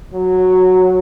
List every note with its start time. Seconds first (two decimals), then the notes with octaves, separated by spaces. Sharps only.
0.14 F#3